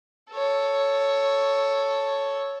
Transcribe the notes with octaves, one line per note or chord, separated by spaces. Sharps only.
A4 C#5